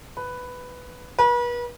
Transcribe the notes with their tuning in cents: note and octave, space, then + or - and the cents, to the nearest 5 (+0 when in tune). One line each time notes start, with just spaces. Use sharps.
B4 +5
B4 -40